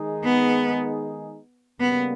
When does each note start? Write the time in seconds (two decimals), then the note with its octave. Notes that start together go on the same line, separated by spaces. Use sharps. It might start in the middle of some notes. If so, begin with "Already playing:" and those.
Already playing: D#3 G#3 D#4 G#4
0.24 B3
1.80 C#3 G3 A#3 B3